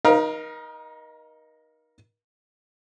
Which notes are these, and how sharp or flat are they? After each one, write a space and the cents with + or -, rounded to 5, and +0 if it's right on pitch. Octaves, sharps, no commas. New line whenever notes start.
D#4 +0 A#4 +35 F5 +0